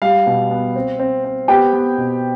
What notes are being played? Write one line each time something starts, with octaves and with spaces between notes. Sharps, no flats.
G3 F5
B2
B3
C4
C4
C4
B3 G4 G5
B3
B2